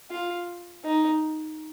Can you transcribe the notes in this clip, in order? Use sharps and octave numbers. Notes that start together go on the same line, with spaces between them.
F4
D#4